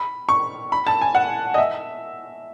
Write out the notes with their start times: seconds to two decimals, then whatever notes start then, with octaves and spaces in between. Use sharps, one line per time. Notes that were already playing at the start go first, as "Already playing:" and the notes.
Already playing: B5
0.29 C#6
0.72 B5
0.87 A5
1.01 G#5
1.15 F#5
1.54 D#5
1.58 E5